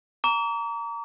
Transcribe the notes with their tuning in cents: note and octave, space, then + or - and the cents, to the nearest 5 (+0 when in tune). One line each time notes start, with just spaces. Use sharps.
A#5 -10 D6 -45